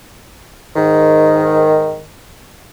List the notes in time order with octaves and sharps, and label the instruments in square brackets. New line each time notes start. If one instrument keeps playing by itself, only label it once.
[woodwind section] G#2 D#3